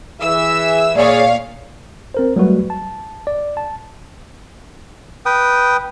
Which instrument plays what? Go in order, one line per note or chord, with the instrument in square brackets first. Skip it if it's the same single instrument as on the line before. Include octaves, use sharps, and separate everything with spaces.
[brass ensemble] E3 G#4 E5 [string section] E6
[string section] A#2 C#5 F5 [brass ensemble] G#4 [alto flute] D5
[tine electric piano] C4 A#4 C5
F#3 G3 A3 F#4 B4
A5
D5
A5
[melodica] B4 G5 D#6